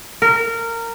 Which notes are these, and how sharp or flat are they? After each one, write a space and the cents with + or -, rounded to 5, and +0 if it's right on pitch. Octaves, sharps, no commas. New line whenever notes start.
A#4 -20